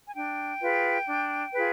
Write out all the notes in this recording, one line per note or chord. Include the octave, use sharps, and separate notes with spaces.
G#5
D4 G5
F4 G#4 B4
D4
F4 G#4 B4